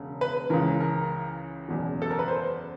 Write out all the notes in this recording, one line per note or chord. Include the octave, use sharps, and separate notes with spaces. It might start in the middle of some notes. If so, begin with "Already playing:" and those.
Already playing: E1 C#3
B4
C#2 C#3 E3 A#4
A#4
F#1 E2 B2
A4
A#4
B4
C5